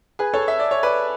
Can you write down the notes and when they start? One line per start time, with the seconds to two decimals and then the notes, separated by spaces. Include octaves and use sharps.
0.19 G#4 B4
0.34 A4 C#5
0.48 E5
0.59 D5
0.71 C#5
0.83 B4 D5